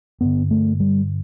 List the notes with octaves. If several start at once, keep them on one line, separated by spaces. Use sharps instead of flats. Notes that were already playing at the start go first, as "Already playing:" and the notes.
G2 D3 B3
A3
G3